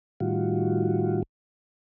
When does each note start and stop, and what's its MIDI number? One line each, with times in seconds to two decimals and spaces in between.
0.20 1.23 45
0.20 1.23 51
0.20 1.23 55
0.20 1.23 65
0.20 1.23 66